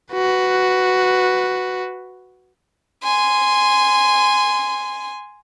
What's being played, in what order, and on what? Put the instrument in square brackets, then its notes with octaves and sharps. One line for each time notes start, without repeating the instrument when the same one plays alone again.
[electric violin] F#4 B4
[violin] G#5 C6